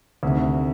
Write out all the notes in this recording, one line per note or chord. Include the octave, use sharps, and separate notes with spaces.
D2 C3 D#3